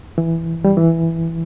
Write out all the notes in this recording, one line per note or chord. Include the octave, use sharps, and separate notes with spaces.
E3
G3
E3